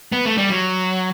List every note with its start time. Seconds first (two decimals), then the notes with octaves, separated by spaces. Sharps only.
0.12 B3
0.26 A3
0.38 G3
0.50 F#3